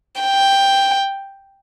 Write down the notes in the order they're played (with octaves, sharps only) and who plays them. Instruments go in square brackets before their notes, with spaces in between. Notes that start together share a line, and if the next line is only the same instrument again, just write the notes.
[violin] G5